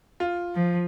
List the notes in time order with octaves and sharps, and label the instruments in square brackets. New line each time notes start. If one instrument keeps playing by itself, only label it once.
[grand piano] F4
[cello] F3